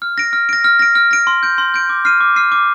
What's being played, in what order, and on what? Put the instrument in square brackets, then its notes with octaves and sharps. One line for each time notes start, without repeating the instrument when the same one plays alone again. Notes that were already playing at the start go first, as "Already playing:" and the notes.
[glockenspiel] F6
A#6 D7
F6
A#6 D7
F6
A#6 D7
F6
A#6 D7
C6
G6 D7
C6
G6 D7
D6
F6 C7 D#7
D6
F6 C7 D#7
D6